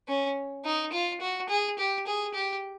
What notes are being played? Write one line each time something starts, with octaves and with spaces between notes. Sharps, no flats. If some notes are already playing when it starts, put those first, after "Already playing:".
C#4
D#4
F4
F#4
G#4
G4
G#4
G4